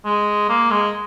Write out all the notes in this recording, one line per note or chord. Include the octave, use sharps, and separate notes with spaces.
G#3
A#3
G#3